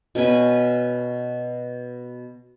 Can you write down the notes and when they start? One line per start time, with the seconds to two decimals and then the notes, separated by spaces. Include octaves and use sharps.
0.15 B2 C#4 B4 G#5